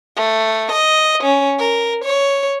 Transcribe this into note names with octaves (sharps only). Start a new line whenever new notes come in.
A3
D#5
C#4
A#4
C#5